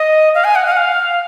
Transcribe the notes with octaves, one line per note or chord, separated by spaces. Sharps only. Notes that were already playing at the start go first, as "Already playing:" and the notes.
Already playing: D#5
F5
G#5
F#5
F5
F#5
F5